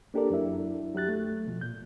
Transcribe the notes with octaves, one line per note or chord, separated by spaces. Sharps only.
A#3 D4 G4 A4 A#4 D5
F#2 F#3 D4 E4 E5
F#3 G4 F#6 A6
A3
B2 F3
A#2 G6